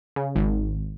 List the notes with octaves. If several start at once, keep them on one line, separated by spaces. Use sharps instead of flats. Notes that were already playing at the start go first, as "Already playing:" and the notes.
C#3
G#1